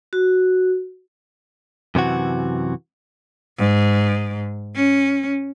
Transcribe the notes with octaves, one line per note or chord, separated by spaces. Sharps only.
F#4
F#2 C3 E3 F#4
G#2
C#4